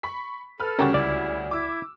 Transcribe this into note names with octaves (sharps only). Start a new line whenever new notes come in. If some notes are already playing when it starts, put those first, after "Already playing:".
B5 C#6 B6
A4 B4 F6
D2 C#3 G3 C#4 F#4 G4 A#4
C#2 E4 D5
E4 D6 E6